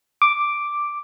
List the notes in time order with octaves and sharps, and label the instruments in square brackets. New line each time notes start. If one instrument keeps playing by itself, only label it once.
[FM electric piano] D6